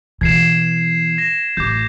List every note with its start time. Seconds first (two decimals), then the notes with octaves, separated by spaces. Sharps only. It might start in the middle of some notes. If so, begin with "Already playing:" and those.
0.21 B2 E3 G#6 C7 E7
1.18 A#6 E7
1.57 A1 D6 G6